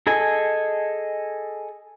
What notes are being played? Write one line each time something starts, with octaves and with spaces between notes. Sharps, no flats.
G#4 A4 D#5 G#5